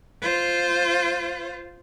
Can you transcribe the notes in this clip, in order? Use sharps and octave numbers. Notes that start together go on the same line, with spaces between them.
F4 C5